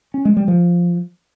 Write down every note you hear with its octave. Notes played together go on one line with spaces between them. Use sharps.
C#4
G#3
G3
F3